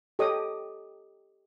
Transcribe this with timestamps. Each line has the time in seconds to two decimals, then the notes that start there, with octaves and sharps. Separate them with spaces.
0.19 G4 A4 C#5 D#5 D#6